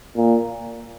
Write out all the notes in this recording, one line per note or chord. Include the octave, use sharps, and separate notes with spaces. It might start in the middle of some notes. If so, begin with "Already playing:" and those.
A#2